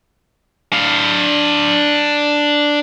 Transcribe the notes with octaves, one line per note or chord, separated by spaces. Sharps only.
D4 F5